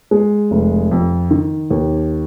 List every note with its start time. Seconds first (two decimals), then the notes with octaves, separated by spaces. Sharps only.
0.11 G#3
0.51 F1
0.91 F2
1.31 D#3
1.71 D#2